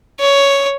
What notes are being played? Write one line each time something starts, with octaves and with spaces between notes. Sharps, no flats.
C#5